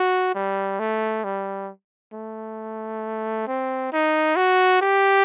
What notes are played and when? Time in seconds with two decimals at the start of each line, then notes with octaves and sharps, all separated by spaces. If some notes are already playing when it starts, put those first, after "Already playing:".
Already playing: F#4
0.35 G3
0.79 A3
1.24 G3
2.13 A3
3.47 C4
3.92 D#4
4.36 F#4
4.81 G4